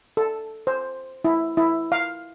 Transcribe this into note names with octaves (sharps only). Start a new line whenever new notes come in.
A4
C5
E4
E4
F5